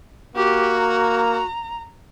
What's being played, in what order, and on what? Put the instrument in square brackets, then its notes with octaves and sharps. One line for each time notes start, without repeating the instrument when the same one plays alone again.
[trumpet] A#3 [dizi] F#4 [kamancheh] G4
[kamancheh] A#5